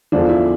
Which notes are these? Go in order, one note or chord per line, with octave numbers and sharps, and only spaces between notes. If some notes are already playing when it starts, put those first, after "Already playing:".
E2 D3 F3 D4
F4
E4